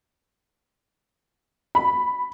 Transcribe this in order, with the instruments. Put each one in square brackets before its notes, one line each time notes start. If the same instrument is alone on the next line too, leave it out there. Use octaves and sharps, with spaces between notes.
[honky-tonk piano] B5